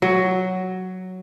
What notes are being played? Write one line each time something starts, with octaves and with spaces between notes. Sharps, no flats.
F#3